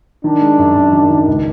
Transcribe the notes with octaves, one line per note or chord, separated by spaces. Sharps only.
D#3 D4
G#3
F#2
F#2
D#3
D#3
C#2